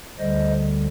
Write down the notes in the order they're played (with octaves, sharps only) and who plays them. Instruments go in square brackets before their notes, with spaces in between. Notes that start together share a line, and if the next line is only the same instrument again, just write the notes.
[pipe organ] D2 D3 G3 C5 D#5